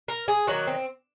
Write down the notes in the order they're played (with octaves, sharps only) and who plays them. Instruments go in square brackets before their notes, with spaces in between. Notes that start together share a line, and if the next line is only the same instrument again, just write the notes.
[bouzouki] A#4
G#4
D#3 F#3 A#3 F#4
C4